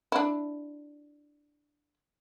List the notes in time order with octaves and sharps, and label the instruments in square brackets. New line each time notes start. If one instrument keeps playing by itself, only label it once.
[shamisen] D4 E4